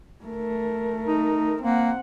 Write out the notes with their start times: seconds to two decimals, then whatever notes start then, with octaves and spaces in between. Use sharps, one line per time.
0.24 A3 A#4
1.07 D#4
1.62 A#3 C4 F#5